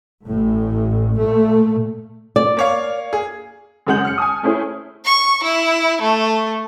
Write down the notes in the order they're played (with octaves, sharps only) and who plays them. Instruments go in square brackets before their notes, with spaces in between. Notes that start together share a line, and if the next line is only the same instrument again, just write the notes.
[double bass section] A1 A2
A#2 A3
[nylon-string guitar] D5
[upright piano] A#3 C#5 F5
G#4
[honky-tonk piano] F#2 C#3 G#3 F#5 G6 F#7
F6 C#7
G#5 A5 D#6
A3 C#4 E4 G#4 C5
[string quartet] C#6
E4
A3